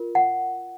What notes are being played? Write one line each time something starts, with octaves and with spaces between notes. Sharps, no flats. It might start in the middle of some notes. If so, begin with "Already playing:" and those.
Already playing: F4 A#4
F#5